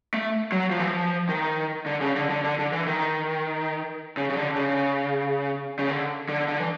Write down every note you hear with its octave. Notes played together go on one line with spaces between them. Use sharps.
A3
F#3
F3
E3
F3
D#3
D3
C#3
D3
D3
D3
D3
E3
D#3
C#3
C#3
D3
C#3
C#3
D3
D3
D3
E3